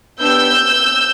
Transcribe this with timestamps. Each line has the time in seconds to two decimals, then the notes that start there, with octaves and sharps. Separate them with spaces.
0.19 B3 D4 G4 E6 G6